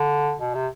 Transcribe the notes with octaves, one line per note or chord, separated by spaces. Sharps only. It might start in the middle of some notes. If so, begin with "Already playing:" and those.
Already playing: D3
B2
C3